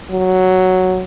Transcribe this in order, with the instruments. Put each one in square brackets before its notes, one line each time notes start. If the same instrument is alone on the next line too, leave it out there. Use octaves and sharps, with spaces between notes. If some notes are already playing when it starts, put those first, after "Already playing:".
[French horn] F#3